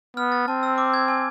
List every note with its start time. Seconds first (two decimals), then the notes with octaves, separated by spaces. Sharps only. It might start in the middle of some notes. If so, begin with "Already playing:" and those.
0.17 B3 F6
0.32 A6
0.48 C4 A5
0.63 E6
0.78 D6
0.94 G#6
1.08 G#5